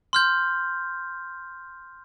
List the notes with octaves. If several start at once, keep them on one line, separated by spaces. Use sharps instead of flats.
C6 F6 G6